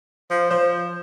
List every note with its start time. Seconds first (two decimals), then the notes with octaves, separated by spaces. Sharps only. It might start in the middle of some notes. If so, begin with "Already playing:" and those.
0.30 F3
0.50 F3 C5